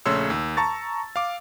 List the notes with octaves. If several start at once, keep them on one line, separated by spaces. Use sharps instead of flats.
A#1 C#3 A3 C#5 C6 E6
D#2
A5 A#5 C#6 A6
F5 D6